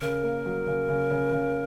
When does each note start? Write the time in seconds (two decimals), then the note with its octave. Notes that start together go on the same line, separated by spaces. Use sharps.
0.01 C#3 A#4
0.23 A#3
0.46 F#3
0.67 C#3
0.89 C#3
1.11 C#3
1.32 C#3